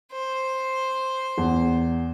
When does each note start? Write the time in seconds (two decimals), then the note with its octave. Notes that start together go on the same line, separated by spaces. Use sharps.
0.12 C5
1.38 E2